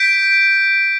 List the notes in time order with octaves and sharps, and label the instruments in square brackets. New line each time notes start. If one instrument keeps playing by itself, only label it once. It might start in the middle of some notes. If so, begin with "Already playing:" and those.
Already playing: [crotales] G6 B6 D7